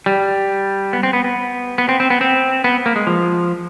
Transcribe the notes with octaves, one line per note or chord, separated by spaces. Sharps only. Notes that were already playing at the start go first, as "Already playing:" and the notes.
G3
B3
C4
B3
B3
B3
C4
C4
B3
C4
B3
A#3
G#3
F3